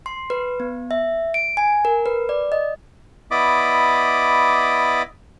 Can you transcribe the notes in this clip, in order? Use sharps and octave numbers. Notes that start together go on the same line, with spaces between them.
C6
B4
B3
E5
D7
G#5
A#4
B4
D5
D#5
B3 E4 D5 D#5 B5 D6